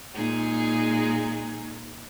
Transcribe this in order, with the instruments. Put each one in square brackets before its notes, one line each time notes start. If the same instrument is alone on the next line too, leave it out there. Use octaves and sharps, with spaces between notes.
[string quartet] A#2 G#3 D#4 G#4